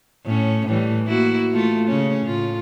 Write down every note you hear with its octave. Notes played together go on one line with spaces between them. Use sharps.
A2 C#4
A2 E3 G3
A#3 E4 F#4
A3 F4
C#3 C#4
A2 F4